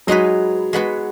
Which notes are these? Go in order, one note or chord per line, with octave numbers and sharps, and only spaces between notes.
F#3 G#3 D#4 F#4 B4
G#3 B3 F#4 B4